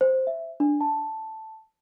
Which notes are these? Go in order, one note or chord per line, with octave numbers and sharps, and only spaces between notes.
C5
E5
D4
A5